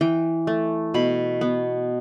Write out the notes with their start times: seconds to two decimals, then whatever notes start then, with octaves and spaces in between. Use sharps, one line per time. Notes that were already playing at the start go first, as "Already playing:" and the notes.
0.01 E3 G5
0.47 A3
0.94 B2 B5
1.41 B3